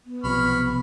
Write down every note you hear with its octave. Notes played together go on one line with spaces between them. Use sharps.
B3
B1 C3 F3 B5 C#6 F6